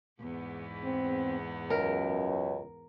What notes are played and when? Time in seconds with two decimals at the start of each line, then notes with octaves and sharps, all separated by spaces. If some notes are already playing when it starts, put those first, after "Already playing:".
0.20 E2 G#2 B3
0.84 C4
1.70 C#2 F#2 A#4